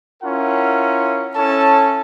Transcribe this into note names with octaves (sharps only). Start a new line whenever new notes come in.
C#4 E4 F4 A#4 F#5
C#4 E4 A4 C#5 A5